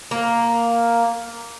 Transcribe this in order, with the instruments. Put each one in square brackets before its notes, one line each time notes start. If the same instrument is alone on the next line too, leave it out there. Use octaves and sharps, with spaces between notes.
[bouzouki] A#3